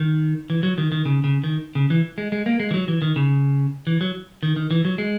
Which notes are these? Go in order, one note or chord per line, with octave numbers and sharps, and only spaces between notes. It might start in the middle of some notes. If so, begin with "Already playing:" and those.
Already playing: D#3
E3
F#3
D#3
D#3
C#3
C#3
D#3
C#3
E3
G#3
G#3
A#3
G#3
E3
F#3
E3
D#3
C#3
E3
F#3
D#3
D#3
E3
F#3
G#3